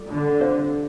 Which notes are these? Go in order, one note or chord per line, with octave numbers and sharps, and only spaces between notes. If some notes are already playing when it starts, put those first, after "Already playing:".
Already playing: G3 F4 A4 D5
D3
C3 G3 F4 C5